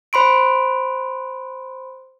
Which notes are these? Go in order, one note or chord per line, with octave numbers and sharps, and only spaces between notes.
C5 B5 C6 D7